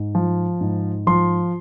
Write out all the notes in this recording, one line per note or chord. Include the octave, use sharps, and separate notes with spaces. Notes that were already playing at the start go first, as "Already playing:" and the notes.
Already playing: G#2
F3
G#2
F3 C6